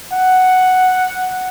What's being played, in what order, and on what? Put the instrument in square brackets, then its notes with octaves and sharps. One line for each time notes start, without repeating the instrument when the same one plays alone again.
[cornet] F#5